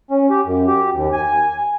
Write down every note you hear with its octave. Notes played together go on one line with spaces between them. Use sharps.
C#4
G4
F#2
G4
D#2
G#5